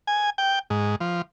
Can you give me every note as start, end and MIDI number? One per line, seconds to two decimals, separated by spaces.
0.07 0.30 80
0.38 0.59 79
0.70 0.96 44
1.01 1.22 53